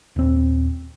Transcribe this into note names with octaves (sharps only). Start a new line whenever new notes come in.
D#1 C4